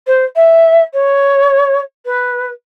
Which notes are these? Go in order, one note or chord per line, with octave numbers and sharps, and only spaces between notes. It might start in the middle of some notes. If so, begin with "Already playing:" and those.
C5
E5
C#5
B4